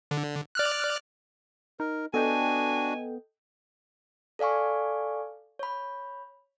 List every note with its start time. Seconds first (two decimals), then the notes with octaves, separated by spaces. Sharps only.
0.11 D3
0.55 D5 F6 F#6
1.80 D#4 A#4
2.14 B3 D4 F#4 A4 D#5 G5 G#5
4.39 A4 D5 F5 G#5 C#6
5.59 C#5 B5